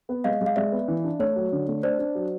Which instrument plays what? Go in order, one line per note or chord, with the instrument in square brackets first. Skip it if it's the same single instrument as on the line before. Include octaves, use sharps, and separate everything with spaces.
[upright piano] B3
[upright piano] G#3 [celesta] D#5 F5
[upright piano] G#3
[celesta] F5
[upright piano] G#3 [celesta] D5 E5
[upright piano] B3
E3
D4
[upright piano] A3 [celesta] C#5
[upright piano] F#3
D3
A3
[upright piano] D4 [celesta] C5 D5
[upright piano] D4
F#3